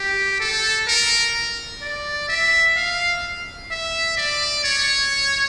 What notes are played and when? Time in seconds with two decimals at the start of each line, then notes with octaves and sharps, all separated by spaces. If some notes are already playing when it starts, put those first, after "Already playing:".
Already playing: G4
0.40 A4
0.87 A#4
1.82 D5
2.29 E5
2.77 F5
3.71 E5
4.17 D5
4.64 C#5